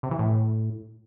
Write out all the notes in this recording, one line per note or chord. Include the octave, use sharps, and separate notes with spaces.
C3
E3
A2